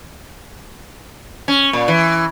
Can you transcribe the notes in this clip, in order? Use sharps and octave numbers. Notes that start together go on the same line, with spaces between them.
C#4
A#2
E3